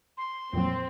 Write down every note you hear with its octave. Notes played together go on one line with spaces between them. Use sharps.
C6
F2 A#2 F#3 C4